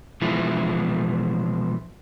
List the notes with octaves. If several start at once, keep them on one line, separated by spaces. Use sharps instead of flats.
B2 E3 F3 G#3 E4